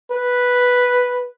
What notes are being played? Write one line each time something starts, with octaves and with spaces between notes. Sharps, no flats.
B4